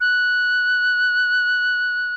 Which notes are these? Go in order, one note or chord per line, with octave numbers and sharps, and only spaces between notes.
F#6